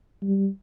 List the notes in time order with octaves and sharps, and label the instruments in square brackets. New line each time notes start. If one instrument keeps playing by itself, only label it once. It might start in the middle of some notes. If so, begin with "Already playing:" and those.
[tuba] G3